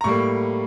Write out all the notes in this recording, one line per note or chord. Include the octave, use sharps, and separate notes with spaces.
A#5
A2 G3 A#3 C#6